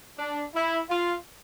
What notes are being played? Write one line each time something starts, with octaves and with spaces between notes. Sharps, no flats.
D4
E4
F4